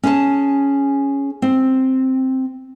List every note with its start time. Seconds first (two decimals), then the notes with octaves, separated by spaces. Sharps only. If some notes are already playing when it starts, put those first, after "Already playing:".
0.03 C#4 G#4 A5
1.42 C4